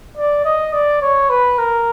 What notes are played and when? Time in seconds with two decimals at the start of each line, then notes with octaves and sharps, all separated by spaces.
0.17 D5
0.45 D#5
0.73 D5
1.02 C#5
1.30 B4
1.58 A#4